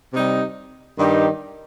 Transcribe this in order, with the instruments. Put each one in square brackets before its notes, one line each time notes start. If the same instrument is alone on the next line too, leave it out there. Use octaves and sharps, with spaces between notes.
[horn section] C3 G3 D#4
G2 D#3 G3 D#4 G4